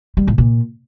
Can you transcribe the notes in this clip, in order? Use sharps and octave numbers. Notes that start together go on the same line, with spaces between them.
G3
A2
A#2